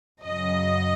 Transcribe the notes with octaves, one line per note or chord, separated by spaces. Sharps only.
F#2 C#3 F#3 D#5